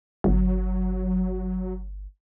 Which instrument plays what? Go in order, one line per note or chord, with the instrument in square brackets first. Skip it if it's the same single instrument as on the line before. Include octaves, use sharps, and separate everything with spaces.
[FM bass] G1 [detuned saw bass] F#3